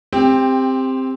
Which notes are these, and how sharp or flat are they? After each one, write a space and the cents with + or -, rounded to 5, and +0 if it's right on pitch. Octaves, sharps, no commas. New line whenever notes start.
C4 +0 G4 +20